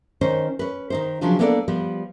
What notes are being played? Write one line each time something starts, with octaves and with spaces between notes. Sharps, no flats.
D#3 C#4 D#4 C5
C#4 B4
D#3 D#4 C5
C#3 F3 F#3 D4 F4
A#3 B3 D4 A4 C#5 D5
F3 G3 B3